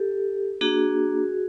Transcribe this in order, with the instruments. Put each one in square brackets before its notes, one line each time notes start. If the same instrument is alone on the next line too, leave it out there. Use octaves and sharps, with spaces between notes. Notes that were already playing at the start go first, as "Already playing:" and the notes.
Already playing: [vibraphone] G4 A4
A#3 D4 F#4 G#4